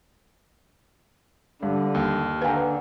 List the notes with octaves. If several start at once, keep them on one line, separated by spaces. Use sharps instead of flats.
G2 D3
D#2
D3 B4 F5 G5 G#5 A#5